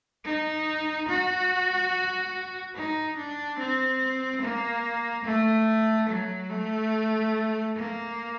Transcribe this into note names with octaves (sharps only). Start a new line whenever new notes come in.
D#4
F#4
D#4
D4
C4
A#3
A3
F#3
A3
A#3